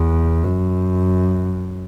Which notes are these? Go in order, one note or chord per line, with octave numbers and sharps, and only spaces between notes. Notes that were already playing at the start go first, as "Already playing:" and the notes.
Already playing: E2
F#2